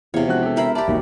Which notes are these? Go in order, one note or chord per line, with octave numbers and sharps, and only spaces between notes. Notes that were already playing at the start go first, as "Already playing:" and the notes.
E2 C3 C#5 F5
E1 F3 F#4 F#6
G4 A4
A#4 C5 E5 B5
G4 D5 E5 A5 B5
E1 D#2 B2